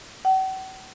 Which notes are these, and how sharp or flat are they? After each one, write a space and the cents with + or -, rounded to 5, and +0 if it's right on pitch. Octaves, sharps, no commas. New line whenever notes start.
F#5 +45